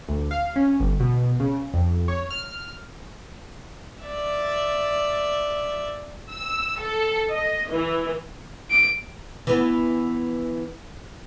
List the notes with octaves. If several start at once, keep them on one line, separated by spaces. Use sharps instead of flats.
D2
F5
C#4
G1
B2
C#3
F2
C#5
F6
D5 E5
E6
A4
D#5
E3
D7
E3 B3